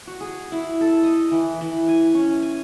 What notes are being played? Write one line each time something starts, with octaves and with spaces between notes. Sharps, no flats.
F#4
G#4
E4
A4
D#5
E3
E3
G#5
C#4
G#5